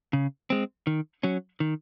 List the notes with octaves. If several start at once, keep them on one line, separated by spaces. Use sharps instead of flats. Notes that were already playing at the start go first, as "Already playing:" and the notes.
C#3
G#3 C4
D#3
F#3 C#4
D#3